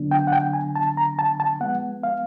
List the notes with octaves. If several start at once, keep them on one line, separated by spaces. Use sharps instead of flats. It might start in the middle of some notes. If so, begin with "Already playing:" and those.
Already playing: D3 F#3 B3 D4
G5
F#5
G5
G#5
A5
A#5
A5
A5
F3 G#3 B3 F#5
F5